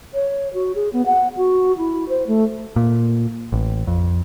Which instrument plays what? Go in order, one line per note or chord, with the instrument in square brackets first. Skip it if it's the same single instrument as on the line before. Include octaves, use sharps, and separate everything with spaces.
[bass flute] C#5
F#4
G#4
B3
F#5
F#4
E4
C5
A3
[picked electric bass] A#2
A1
F2